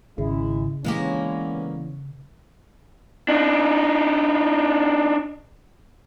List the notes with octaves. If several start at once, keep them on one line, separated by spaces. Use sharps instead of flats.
G#1 C#3 G#3 E4
D3 E3 G#3 A#3 B3 C#4 G4
D4 D#4